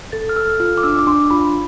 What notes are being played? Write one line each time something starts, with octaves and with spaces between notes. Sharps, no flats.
A4 A6
F6
A4 E6
F4 F6
D6
D4 E6
D6
D4 C6
F4 B5